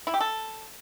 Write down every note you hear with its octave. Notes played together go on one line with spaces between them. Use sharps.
E4
G4
A4